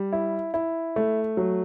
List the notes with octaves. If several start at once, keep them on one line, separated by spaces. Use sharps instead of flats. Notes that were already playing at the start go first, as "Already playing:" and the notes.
Already playing: G3
E4
E4
A3
F#3